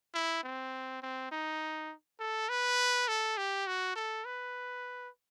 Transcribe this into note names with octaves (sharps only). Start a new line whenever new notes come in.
E4
C4
C4
D#4
A4
B4
A4
G4
F#4
A4
B4